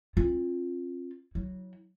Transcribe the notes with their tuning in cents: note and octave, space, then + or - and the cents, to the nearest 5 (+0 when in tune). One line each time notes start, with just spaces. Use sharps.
C4 +45 F4 +0
F#3 +0 E4 -35